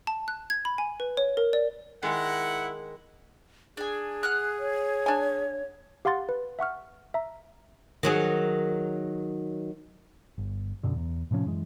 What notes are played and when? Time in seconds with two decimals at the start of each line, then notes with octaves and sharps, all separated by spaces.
0.07 A5
0.28 F#6
0.50 G#6
0.65 B5
0.78 G#5
1.00 B4
1.17 C#5
1.37 A#4
1.53 D5
2.03 D#3 G#3 E4 F#5
3.77 D4 G#4 G#5
4.23 F#5 F6 F#6
4.59 C#5
5.06 D4 G#5
6.05 G4 F5 F#5 C6 A6
6.29 B4
6.59 E5 F#5 C#6 F6
7.14 E5 A#5
8.03 D#3 F#3 G#4
10.38 G1
10.83 F#2 B2 D3
10.96 E2
11.31 A2 C3 F3 C#4
11.46 F#2 E3 G#3